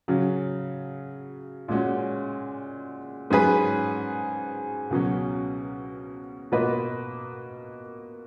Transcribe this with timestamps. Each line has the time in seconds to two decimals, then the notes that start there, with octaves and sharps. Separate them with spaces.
0.08 C#3 F#3 C#4
1.68 A#2 G#3 C#4 F#4
3.30 G#2 F#3 C#4 G#4 B4
4.90 C#2 B2 F#3 C#4
6.52 B2 A#3 F4 B4 D#5